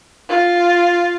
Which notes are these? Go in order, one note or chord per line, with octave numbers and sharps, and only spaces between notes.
F4